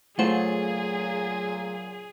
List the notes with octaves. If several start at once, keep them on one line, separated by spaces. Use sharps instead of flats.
A#2 C#3 F#3 A3 F4 G#4 C5 F#5